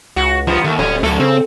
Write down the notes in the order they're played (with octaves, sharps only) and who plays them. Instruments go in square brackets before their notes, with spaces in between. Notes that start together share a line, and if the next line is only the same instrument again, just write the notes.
[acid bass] C#2 [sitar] F#4
[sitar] F#2 B3 [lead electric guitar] F3
[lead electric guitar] D#2 [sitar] A3
[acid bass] D1 [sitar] A#2 G3 [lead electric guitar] C#4
[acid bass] D2 [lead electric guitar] F#3 A3 [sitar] A4
[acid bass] C#3 [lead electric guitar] C4